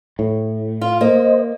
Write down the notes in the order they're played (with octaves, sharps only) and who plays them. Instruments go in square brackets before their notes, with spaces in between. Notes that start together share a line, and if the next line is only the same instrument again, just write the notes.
[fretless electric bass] A2
[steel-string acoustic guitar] F4 [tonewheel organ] F5
[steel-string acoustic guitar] A#3 [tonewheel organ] C5 D#5